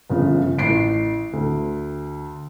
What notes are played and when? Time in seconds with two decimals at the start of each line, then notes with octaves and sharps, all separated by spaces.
0.10 G1 C#3 F3
0.59 A1 C7 D7
1.33 D2